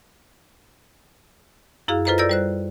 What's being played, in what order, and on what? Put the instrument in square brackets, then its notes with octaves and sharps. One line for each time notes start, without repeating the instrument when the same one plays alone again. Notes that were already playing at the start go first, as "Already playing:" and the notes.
[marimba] F#2 E4 F#4 G#4 F5 F6
F4 A4 B4 C5 D#5 A#5
A4 D5 E6 G6 A#6
G3 C5 F#6